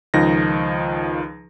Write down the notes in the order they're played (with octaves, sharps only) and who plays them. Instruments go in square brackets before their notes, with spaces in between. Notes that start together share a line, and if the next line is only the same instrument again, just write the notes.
[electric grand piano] C#2 D#3 F3 D#4 A#6